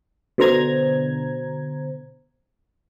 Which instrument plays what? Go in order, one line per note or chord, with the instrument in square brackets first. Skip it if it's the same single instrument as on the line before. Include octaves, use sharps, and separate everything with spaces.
[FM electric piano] B2 D3 C5 A#5 G#6